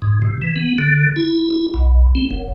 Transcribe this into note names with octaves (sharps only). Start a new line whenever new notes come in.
G#2
C3
E3
B3
D3
E4
E4
B1
C4
F#1